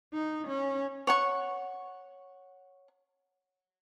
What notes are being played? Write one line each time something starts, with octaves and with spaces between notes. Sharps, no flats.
D#4
C#4
C#5 F#5 C#6